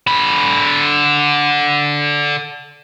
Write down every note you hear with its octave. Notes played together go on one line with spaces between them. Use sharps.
D3 B5